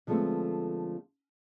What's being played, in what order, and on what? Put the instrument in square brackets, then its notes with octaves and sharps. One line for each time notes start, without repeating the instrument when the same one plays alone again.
[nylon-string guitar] D3 F3 G#3 A3 B3 C4